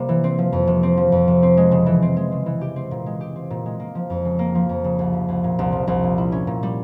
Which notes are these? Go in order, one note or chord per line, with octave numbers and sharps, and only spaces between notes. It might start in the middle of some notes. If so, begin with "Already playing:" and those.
Already playing: C3 G3 A#3
E3
C4
F3
F2
C3
C4
F3
F2
C3
C4
G#3
C#3
E3
C4
G#3
C#3
E3
G4
C4
A#2
G#3
G4
C4
A#2
G#3
A#3
F3
F2
C#3
A#3
F3
F2
C#3
C2
F3
C2
A#2
C2
F3
C2
A#2
E4
C#4
A#2
G3